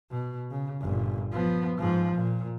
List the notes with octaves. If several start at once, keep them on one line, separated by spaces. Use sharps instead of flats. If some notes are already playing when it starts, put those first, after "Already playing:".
B2
C#3
G1 A#2
F3 B3
G#2 F3
A#2